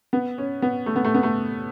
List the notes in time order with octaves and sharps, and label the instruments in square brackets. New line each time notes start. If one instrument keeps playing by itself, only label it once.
[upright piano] B3
C#4
B3
A3
B3
A3
B3
A3